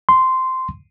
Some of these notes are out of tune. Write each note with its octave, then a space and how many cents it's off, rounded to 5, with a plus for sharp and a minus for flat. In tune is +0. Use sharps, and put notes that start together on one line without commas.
C6 -10